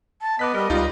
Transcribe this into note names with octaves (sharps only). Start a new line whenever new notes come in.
A5
B3 D#5 D6 F#6 B6
G3 A#4
C#2 G3 D#4 F4